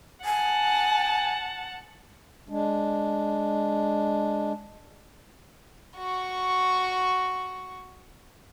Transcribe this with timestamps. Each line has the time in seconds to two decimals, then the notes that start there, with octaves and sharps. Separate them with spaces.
0.25 F#5 G#5 A5
2.49 G#3 D4
5.97 F#4 C#6